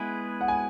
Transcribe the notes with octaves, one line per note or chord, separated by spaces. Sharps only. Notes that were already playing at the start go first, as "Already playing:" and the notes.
Already playing: G#3 B3 E4 G#4 B4
F#5
G#5